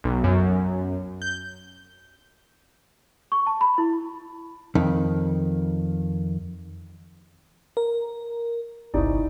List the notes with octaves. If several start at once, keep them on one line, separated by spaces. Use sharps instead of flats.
B1
F#2
G6
C#6
A5
B5
E4
F2 D#3
A#4
G1 C2 D#4 E4 D5